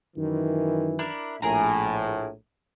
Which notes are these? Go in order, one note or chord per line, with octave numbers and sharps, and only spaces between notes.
F#2 D#3 E3
D4 E4 A#4
A#1 A2 G#4 A#4 A#5